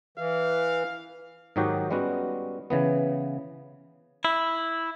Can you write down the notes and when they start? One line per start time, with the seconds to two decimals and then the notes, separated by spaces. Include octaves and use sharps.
0.18 E3 F5
1.56 G#2 D#3 F#3 D#4 F#4 G4
1.91 G3 G#3 B3 C#4 F#4
2.70 C#3 E3 B3
4.25 E4